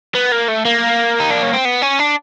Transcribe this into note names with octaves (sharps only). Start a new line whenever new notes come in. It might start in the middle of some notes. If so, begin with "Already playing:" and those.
B3
A#3
A3
A#3
D#4
D4
C#4
C4
B3
C#4
D4